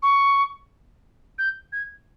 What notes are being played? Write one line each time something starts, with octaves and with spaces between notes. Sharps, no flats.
C#6
G6
G#6